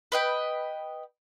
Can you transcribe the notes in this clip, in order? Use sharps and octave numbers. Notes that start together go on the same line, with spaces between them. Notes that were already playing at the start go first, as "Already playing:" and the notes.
B4 D#5 G5